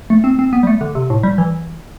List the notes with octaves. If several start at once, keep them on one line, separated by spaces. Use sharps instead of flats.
A3
C4
C4
B3
G3
A3
D3
C3
A2
G3
E3